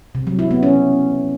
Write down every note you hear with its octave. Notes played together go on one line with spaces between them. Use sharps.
C3
F#3
E4
B3
C#4